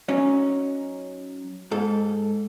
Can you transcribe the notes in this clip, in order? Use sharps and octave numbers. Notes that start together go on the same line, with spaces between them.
F#3 C#4 D#4
G#2 A4